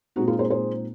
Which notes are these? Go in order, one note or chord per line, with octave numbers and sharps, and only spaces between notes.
A#2 G#3 C4 D#4 F#4
F4 G#4
G#4 C5
G#4 C5